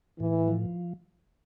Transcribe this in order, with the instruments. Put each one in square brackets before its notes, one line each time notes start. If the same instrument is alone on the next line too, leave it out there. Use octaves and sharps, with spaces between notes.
[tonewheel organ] A2 [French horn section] E3
[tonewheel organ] F3